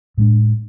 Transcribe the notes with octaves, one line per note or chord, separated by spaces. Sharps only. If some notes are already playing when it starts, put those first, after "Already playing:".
A2 G#3 D4